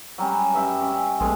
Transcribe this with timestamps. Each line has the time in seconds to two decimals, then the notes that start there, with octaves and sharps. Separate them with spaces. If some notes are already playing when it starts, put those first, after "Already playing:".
0.18 F#3 G3 C#4
0.54 G2 E5
0.81 C#4
1.20 A#1 B2 G#3 A3